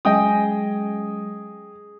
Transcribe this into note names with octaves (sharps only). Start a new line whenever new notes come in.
F#3 G#3 C#4 G#4 D#5 G5 D#6